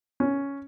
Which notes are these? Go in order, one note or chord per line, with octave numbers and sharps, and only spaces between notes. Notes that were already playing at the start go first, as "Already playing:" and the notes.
C#4